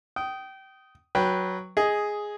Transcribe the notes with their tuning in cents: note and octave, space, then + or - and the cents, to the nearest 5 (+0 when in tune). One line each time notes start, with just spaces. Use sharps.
G5 -25 D#6 +5
F#3 +0 B4 -10 G5 +0
G#4 +0 D#5 +10